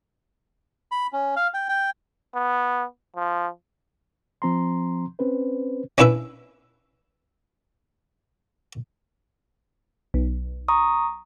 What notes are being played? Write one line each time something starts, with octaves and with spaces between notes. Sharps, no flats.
B5
C#4
F5
G5
G5
B3
F3
F3 C4 A#5 C6
C4 C#4 B4 C5
C#4 D4 E4 B4 E5
B1
A#5 C#6 D#6